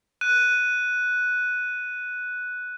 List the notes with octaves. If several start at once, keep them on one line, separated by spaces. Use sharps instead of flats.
F#6 D#7